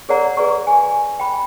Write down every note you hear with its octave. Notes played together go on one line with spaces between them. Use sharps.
G#4 A#4 C#5 D5 F#5 A#5
G#4 B4 D5 A#5 C#6
G#5
G5 B5